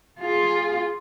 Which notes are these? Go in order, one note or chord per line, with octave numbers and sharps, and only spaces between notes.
F4 G#4